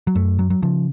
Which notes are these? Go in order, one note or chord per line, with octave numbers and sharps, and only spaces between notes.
F#3
F#2 A3
F#3
F#3
C#3 F3